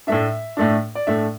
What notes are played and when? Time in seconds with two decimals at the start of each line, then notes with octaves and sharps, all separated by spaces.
0.07 A2 A3 D4 E5
0.57 A2 A3 D4
0.95 D5
1.07 A2 A3 D4 E5